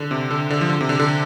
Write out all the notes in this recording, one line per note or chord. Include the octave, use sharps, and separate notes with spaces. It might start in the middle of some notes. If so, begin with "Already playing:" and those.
Already playing: D3
C3
D3
D3
F3
D3
C3
D3
D3